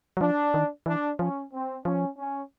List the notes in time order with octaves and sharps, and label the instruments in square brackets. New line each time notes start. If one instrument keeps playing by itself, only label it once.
[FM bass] F#3
[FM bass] F3 [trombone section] D4
[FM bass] D#3
[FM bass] E3 [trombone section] D4
[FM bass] F3 [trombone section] C#4
[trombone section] C4
[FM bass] F3 [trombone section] C#4
[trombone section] C#4